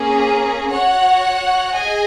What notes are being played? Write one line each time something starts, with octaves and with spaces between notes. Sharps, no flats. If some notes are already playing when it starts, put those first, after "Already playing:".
Already playing: A#3 C#4 G#4
F#4 C#5 F#5
G#4 D#5 G#5